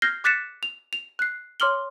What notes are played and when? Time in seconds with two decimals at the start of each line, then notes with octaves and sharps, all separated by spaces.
0.02 F6 G6 G#6 A#6 C7 G7
0.24 D6 F#6 A6 B6 C#7 E7
0.63 F7
0.93 F7
1.19 F#6 C7
1.60 C#5 C6 D6 F6 F#7 G7